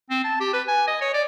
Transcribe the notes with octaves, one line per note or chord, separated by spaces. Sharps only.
C4
A5
G4
B4
G#5
D#5
C#5
D5